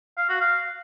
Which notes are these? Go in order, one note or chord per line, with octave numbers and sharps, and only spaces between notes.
F5
F#4
F5